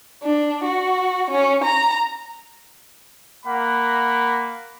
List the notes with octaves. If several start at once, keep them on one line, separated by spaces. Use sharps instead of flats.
D4
F#4
C#4
A#5
A#3 F#5 B5